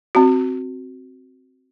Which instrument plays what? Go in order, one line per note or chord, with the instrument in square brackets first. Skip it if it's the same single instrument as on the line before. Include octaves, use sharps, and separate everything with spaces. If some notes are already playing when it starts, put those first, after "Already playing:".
[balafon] C4 F#4